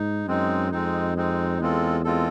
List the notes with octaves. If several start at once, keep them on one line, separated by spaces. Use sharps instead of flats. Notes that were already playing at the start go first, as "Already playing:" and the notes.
Already playing: G#2 D#4
F#2 G#3 C4 D#4
F2 G#3 C4 D#4
G#3 C4 D#4
E2 G#3 C4 F4 A4
G#3 C4 F4 A4